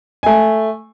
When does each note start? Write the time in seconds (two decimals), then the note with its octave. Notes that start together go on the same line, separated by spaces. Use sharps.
0.23 A3 G#5